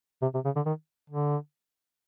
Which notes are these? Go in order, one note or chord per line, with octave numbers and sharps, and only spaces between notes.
C3
C3
C#3
D3
D#3
D3